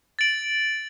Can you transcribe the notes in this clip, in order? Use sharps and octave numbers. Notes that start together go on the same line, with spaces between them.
A6 D7 F#7